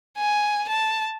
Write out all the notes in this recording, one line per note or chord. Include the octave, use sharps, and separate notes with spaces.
G#5
A5